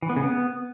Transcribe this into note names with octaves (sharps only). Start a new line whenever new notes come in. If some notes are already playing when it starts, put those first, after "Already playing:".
E3
B3
C#3
B3